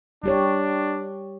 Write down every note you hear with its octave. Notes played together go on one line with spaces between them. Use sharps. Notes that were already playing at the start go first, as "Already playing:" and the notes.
G3 D4 G4 C#5